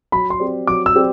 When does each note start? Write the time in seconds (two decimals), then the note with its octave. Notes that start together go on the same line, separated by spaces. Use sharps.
0.12 F#3 B5
0.30 C6
0.40 C4 G4 D5
0.67 F#3 D6
0.86 E6
0.95 C4 G4 D5